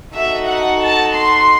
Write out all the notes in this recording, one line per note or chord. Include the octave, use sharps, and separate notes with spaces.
D#4 F#4 A4 E5
F#5
A5
C6